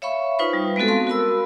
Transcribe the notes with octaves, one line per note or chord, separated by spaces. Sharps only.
C#5 E5 F5 B5 C#6
D#4 F4 B4 C5 C#6
G3
G#3 B3 C4 F#4 A4
F5 A5 C6
F#4 A#4 B5 E6